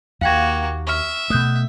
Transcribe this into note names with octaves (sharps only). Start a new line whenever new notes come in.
D#2 A#3 F#4 F5 G5 G#6
E5 C#6 F6
B2 A3 D#6 F#6 G6